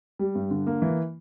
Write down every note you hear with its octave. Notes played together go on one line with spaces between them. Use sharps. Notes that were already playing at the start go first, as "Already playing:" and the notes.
G3
G2
D3
A#3
E3